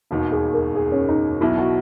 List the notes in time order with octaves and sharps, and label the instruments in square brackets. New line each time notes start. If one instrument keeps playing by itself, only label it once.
[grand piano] E1 D#2 D#3 [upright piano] F#4
[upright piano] G#4
A#4
G#4
C#4
D#4
[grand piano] B1 B2 F#3 [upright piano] E4
[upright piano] F#4